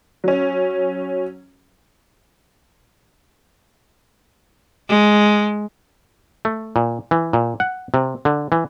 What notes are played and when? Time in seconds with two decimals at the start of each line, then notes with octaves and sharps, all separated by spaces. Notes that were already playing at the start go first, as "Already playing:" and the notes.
0.24 F#3 C#4
4.89 G#3
6.45 A3
6.76 A#2
7.11 E3
7.33 A#2
7.60 F#5
7.94 C3
8.25 D3
8.52 E3